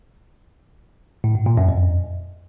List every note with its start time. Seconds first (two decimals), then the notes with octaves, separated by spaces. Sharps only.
1.24 A2
1.35 G#2
1.46 A#2
1.57 F#2
1.69 F2